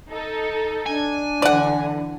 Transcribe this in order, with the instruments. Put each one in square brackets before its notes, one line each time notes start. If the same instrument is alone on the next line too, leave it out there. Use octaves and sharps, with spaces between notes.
[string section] D#4 A4
[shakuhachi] D4 [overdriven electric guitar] G#5
[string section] D3 E3 [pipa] D5 F#5